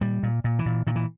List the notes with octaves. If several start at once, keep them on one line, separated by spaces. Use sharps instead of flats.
A#2 G3
A#2
A#2
E3
A#2
A#2 D#3
E3